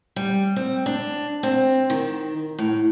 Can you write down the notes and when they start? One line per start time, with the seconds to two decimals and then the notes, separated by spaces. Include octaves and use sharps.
0.16 G3
0.56 C4
0.86 D4
1.43 C4
1.90 D#3
2.59 A2